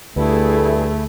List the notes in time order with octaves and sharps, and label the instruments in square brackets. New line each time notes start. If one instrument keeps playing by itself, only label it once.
[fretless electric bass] D2 [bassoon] G2 [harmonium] A3 [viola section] E4 G#4 A4